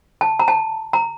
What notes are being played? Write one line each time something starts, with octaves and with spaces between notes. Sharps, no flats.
A5
A#5
A5
A#5